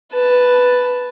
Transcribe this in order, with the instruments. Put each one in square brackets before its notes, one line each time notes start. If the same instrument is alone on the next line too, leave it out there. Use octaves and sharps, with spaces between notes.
[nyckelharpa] B4 A5